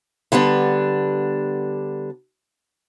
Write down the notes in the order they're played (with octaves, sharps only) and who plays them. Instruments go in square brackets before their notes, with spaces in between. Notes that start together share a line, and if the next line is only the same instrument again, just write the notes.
[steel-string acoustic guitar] D3 G3 B3 D4